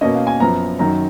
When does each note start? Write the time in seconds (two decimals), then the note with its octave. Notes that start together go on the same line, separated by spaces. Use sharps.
0.01 B2 A#3 C#4 D#5
0.15 F5
0.27 G#5
0.40 F#2 F3 B3 A#5
0.79 F#2 D#3 F#3 A#5